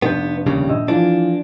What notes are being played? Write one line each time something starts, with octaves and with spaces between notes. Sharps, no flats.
F1 B3 D4 G6
D#2 C#3 G3
A#1 D#5 E6
E3 F3 D4 F4